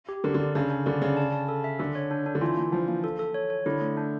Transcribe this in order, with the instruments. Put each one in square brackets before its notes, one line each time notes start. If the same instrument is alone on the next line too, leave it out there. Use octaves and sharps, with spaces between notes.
[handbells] G4
[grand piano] D3 [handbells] A#4
[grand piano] D3
[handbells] D5
[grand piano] C#3 [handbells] D4
[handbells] D4
[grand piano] D3 [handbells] D5
[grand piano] C#3 [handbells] D5
[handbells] A5
A5
A4
E5
[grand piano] D3 [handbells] A4
[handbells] C#5
D4
D4
[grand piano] D3
[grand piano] E3 [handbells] F4
[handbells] A#3
[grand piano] F3 [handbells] D4
[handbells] A#3
A4
A4
C#5
C#5
[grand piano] D3 [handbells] E4
[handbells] A3
D4